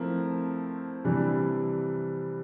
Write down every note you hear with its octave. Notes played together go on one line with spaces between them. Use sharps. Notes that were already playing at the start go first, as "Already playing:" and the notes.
Already playing: F3 A3 C4 E4 A#4
C3 E3 G3 D4